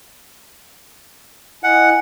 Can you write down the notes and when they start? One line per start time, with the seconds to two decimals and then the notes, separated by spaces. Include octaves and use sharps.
1.64 E4 D#5 F#5 G#5